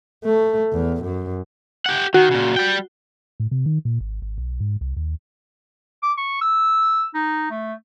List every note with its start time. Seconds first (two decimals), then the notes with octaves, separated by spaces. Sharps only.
0.25 A3
0.72 E2
1.04 F#2
1.86 G4 F#5
2.14 D#3 F#4
2.31 A#2 C#3
2.56 G3 G5
3.40 A2
3.51 C3
3.66 D#3
3.85 A#2
4.00 G#1
4.22 G#1
4.38 B1
4.60 G#2
4.81 C2
4.96 D#2
6.03 D6
6.18 C#6
6.42 E6
7.14 D#4
7.51 A3